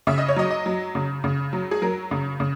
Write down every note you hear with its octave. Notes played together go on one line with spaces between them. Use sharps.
C#3 E5
D#5
C#5
F#3 D#5
D#5
F#3
C#3
C#3
F#3
G#4
F#3 A#4
C#3
C#3